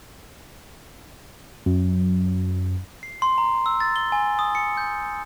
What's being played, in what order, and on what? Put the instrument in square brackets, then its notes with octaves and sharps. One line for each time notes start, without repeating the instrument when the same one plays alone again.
[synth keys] F#2
[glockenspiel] C7
C6
A#5
E6
A6
G7
G#5
D#6
C#7
G6